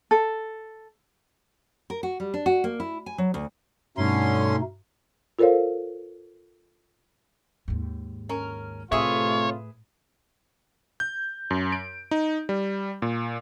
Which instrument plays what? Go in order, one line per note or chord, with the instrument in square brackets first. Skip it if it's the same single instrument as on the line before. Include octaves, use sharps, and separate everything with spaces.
[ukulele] A4
[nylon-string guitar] A#4
F#4
G3
D4
F#4
A#3
E4
G#5
F#3
D2
[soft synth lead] G2 [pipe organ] B2 A3 D#4 [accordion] D3 C#4 C6
[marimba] F4 A4 A#4 C5 C#5 F5
[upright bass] D#2 G#2
[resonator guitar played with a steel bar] C#4 A#4
[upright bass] A2 [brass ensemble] C3 A3 F4 [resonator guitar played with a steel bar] G#4 B4 E5 [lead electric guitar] C#5
[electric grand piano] G6
F#2
D7
D#4
G3
A#2